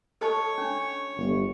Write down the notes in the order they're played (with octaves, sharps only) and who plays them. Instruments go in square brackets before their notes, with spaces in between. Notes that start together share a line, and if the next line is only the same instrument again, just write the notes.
[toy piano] A4 D#5 A5 [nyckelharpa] C#5
[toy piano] C#4 D4
[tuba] G1